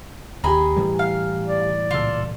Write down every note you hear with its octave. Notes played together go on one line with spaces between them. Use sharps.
D#2 G4 G#4 D#5 G#5 A#5 B5
A2 E3 G3
F5
D5
C#2 A#2 F4 A4